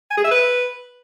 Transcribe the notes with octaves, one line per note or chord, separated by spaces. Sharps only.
G#5
G#4
E5
B4